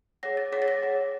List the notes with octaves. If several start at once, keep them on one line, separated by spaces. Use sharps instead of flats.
G#4 C#5 F#5 A#6
A6
G#4 C#5 F#5 B6
A6
A#6
G#4 C#5 F#5